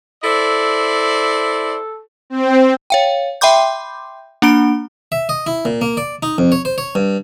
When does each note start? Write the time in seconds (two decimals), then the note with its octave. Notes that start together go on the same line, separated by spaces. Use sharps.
0.24 E4 A4 C5 D5
2.30 C4
2.90 C#5 F5 G5
3.41 E5 G5 B5 C6 D6 G6
4.42 A#3 D4 B5 D7
5.12 E5
5.29 D#5
5.47 E4
5.65 A#2
5.81 A#3
5.97 D5
6.23 D#4
6.38 F2
6.52 C#5
6.65 C5
6.78 C#5
6.95 G2